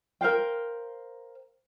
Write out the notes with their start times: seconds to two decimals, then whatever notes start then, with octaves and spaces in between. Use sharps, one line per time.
0.21 A#4 C5 F5 G5